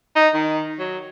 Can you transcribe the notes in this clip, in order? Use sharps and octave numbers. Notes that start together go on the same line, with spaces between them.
D#4
D#3
F#3